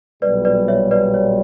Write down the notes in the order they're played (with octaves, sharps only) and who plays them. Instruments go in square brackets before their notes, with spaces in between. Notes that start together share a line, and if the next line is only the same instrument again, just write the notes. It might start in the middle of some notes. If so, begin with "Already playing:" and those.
[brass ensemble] B1 A#2 G3 [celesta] B4 D5
[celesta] B4 D5
C#5 E5
B4 D5
C#5